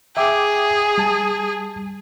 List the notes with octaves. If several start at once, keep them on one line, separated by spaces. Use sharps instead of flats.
G#4 E5 G5 D6
G3 A5